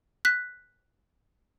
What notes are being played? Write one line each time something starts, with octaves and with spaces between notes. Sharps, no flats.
F#6 B6